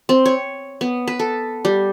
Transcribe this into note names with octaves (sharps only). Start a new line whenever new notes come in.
C4
C#5
B3
B4
A4
G3